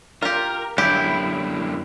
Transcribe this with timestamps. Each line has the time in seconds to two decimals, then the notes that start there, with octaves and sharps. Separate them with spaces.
0.22 F4 G4 A#4
0.78 F#2 D3 E4 G4